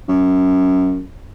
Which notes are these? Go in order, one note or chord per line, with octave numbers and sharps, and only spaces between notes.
F#2